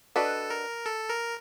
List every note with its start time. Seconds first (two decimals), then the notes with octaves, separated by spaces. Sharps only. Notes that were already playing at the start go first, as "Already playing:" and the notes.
0.16 D4 F#4 A4 B4 D#5
0.50 A#4
0.86 A4
1.10 A#4